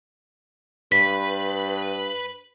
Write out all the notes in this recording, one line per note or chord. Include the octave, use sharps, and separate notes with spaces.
G2 B4 B6